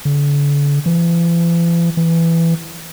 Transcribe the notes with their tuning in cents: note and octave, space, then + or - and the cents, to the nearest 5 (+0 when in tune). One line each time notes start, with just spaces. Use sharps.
D3 -40
E3 +45
E3 +10